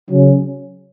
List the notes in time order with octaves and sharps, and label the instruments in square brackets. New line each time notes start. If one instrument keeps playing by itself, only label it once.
[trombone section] C#3 F#3 C#4